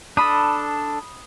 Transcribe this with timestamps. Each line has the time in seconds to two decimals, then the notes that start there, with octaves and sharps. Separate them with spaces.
0.17 D4 A4 B5 D#6